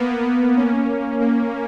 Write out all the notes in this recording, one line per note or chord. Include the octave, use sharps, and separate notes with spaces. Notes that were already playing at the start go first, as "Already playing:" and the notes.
Already playing: A#3 B3
A#3 C#4
A#3